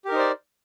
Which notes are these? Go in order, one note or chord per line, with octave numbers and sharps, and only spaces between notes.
D#4 G4 A#4 C5 D5